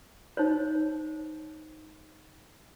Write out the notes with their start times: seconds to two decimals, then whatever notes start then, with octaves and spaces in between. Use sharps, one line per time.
0.37 D#4 C5 C#5